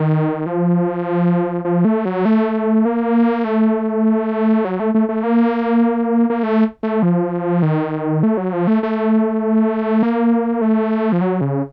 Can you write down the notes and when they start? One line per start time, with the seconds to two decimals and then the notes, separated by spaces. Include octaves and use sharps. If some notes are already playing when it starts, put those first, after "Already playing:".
Already playing: D#3
0.46 F3
1.65 F3
1.85 A3
2.05 F#3
2.25 A3
2.85 A#3
3.44 A3
4.65 F#3
4.80 A3
4.95 A3
5.09 A3
5.23 A#3
6.30 A#3
6.43 A3
6.83 A3
7.03 F3
7.62 D#3
8.23 A3
8.37 F#3
8.53 F3
8.67 A3
8.83 A3
10.02 A#3
10.61 A3
11.12 F3
11.21 F#3
11.41 C#3